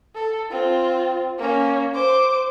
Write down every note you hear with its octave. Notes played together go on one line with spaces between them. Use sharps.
A4
C4 F4
A#3 C#4
C5 D6